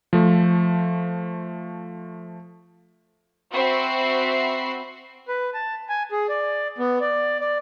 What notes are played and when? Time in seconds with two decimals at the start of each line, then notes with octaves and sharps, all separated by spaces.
0.13 F3 A3
3.52 C4 F#4 E5 B5 C7
5.28 B4
5.54 A5
5.89 G#5
6.11 G#4
6.29 D5
6.78 B3
7.01 D5
7.41 D5